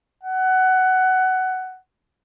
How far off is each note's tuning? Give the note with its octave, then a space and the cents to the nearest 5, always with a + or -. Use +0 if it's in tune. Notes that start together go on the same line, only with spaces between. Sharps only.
F#5 +15